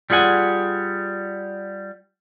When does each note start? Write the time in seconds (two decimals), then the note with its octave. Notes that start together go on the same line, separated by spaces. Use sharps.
0.10 G3 F4 G#4 F#5 G#5